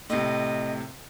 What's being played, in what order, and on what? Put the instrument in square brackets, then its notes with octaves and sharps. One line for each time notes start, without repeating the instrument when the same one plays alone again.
[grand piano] A2 C3 [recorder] D#5